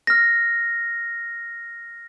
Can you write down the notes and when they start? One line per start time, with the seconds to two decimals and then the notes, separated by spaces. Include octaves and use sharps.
0.07 F6 A#6